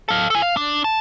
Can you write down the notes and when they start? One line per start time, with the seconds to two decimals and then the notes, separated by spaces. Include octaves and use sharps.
0.09 A4 F5
0.30 A4 G#5
0.42 F5
0.57 D4
0.84 A5